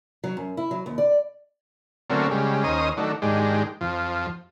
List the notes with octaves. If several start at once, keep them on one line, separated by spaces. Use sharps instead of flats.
F#3
F#2
E4
F#3
D#2
D5
D3 F#3 A3 A#3 C4 C#4
C#3 G3 G#3
D#2 C#4 C5 D#5 A#5 D#6
D#3 F#3 A3 D4
G#2 D#3 G#3 D4 G4
F2 F3